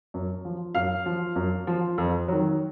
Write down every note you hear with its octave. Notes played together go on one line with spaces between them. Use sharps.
F#2
F3
F#2 F5 F6
F3
F#2
F3
F2
D#3 F#3